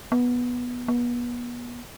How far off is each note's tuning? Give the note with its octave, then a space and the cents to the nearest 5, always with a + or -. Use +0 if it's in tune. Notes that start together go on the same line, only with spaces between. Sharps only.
B3 -10
B3 -35